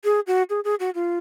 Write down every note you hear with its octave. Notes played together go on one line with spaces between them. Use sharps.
G#4
F#4
G#4
G#4
F#4
F4